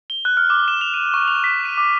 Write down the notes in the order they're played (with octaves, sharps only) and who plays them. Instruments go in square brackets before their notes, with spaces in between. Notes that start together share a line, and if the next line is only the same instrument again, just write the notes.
[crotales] G7
F#6
F6
D6
E7
F7
D#7
C#6
F7
B6
D#7
D6